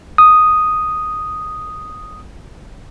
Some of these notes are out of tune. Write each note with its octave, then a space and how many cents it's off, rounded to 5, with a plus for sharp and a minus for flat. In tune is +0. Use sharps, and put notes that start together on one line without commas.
D#6 +0